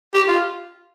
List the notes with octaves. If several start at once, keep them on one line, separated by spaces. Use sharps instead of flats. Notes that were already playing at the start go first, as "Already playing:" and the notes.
G4
F4